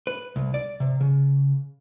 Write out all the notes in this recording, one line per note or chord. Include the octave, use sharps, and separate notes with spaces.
B4
C2
D5
C3
C#3